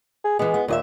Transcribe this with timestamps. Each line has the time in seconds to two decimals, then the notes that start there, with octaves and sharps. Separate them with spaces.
0.24 G#4
0.39 E3 G#3 B3
0.54 B3
0.68 D#2 A#2 D#5 E5